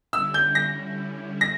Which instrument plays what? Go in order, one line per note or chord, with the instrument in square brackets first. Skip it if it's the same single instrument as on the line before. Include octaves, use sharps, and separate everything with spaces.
[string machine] D3 G3 C#4 E4 [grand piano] E6
[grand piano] G6
A#6
A#6